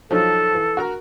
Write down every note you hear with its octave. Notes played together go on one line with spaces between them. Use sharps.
F3 F#3 D#4 A4
E3
F#4 A#4 A#5